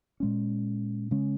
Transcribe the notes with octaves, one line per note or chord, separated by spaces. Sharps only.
A#2 G#3 C#4
C#3 G#3 C#4